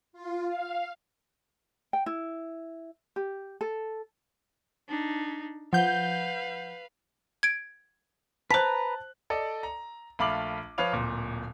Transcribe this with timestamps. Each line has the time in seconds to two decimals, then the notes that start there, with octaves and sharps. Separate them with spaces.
0.13 F4
0.48 F5
1.93 G5
2.06 E4
3.16 G4
3.61 A4
4.88 D4 D#4
5.73 F3 B4 F5 F#5 G6
7.43 G#6 D7
8.51 B4 C5 A5 A#5 F#6 B6
9.30 A4 D5 D#5
9.63 A#5
10.19 A#1 A3 F5 B5 D6 F#7
10.78 F3 B4 C#5 F5 F7
10.92 D1 A#2